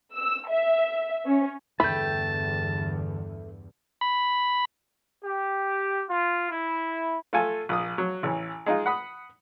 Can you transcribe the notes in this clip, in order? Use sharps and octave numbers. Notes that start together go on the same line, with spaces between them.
E6
E5
C#4
E2 G2 D3 A3 G5 A5 B5
B5
G4
F4
E4
A3 F4 A4 G#5
A#1 D#6
F#3
A1 E3
G#3 D#4 F4
F#5 B5 D#6